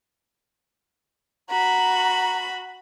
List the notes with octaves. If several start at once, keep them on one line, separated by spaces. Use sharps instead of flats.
F#4 A#5 B5